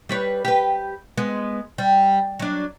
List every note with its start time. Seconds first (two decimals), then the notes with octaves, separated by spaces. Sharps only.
0.09 G3 B4 C#5
0.45 G4 B4
1.17 G#3 B3
1.78 G3
2.39 F#3 D4